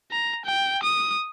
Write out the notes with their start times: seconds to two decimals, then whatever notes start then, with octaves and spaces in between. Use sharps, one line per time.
0.11 A#5
0.45 G5
0.83 D#6